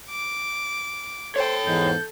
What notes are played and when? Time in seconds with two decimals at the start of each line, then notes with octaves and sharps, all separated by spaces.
0.10 D6
1.36 A4 C5 C#5 G5
1.67 E2 G#2 G6